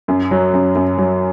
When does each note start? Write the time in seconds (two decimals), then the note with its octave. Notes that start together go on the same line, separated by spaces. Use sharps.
0.08 F#2
0.31 F#3
0.54 F#2
0.75 F#2
0.98 F#3